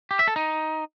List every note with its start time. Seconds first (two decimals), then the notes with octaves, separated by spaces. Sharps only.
0.11 G4
0.19 E5
0.27 A4
0.36 D#4